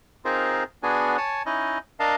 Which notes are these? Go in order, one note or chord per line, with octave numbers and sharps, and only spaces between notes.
C4 D#4 F4 G#4 A#4 C5
B3 D4 F#4 G#4 G#5
C#5 G#5 A5
C#4 D#4 E4 D#5
D4 A#4 D#5 F5 A5